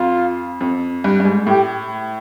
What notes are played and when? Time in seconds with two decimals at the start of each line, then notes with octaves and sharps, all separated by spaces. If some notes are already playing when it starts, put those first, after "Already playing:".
Already playing: F2 F4
0.61 F2
1.04 G2
1.20 G2
1.25 G#2
1.47 A2 G4